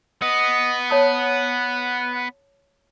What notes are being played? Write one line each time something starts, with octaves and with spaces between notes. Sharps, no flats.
B3 D#5
C#5 F#5 A5 D#6